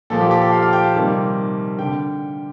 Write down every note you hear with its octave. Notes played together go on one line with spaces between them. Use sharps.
A#2 F3 A#3 A4
G4
G4
A4
F5
F5
G5
A5
C3 D#3 G3 A#3
D3 G5